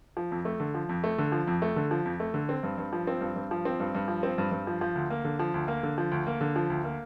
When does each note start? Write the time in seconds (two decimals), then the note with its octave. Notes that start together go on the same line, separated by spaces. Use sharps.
0.17 F3
0.31 F2
0.45 A3
0.60 D3
0.74 F3
0.89 F2
1.04 A3
1.18 D3
1.32 F3
1.47 F2
1.62 A3
1.76 D3
1.91 F3
2.05 F2
2.20 A3
2.34 D3
2.49 C4
2.63 G2
2.78 G2
2.93 F3
3.07 C4
3.21 G2
3.36 G2
3.51 F3
3.65 C4
3.80 G2
3.95 G2
4.08 F3
4.23 C4
4.38 G2
4.51 G2
4.67 F3
4.81 F3
4.95 D2
5.10 A#3
5.24 D3
5.39 F3
5.54 D2
5.68 A#3
5.83 D3
5.98 F3
6.11 D2
6.27 A#3
6.41 D3
6.56 F3
6.70 D2
6.84 A#3